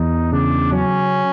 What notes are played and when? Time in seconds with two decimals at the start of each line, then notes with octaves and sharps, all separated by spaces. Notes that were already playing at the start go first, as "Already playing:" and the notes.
Already playing: E2 D#4
0.32 C#3 D4
0.72 F#3 C#4